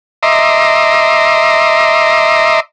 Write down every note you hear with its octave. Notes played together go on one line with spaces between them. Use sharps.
D#5 E5 A#5 C6 D6